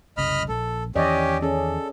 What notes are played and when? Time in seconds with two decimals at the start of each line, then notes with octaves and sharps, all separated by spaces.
0.17 F#1 C2 C#3 D#5 B5 F6
0.49 A#1 A4
0.96 E2 D#3 E3 C#4 G4 D5 D#5
1.42 C#4 G#4 A4